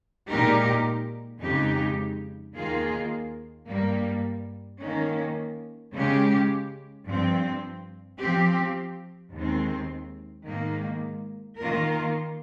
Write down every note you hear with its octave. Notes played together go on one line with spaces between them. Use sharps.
A#2 G#3 D#4 G4 A#4
F2 C#3 G#3 D#4 G4
D#2 D#3 A#3 F4 G#4
G2 G3 A#3
D#3 A#3 C#4
C#3 G#3 C#4 G4
G2 F3 C4
F3 C4 G4
D#2 D#3 G#3 C4
G#2 D#3 A#3
D#3 A#3 F4 A#4